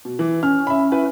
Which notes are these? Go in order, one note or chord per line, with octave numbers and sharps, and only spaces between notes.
B2
E3
C#4 F6
E5 B5
E4 B4